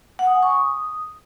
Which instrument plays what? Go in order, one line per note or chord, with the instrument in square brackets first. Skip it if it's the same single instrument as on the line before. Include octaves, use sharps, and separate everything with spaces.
[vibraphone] F#5
D#6
G#5
C#6
D#6